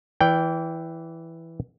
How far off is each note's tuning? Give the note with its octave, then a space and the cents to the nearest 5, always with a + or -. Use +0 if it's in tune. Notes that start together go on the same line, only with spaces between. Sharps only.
E3 +0 D5 -30 G5 +0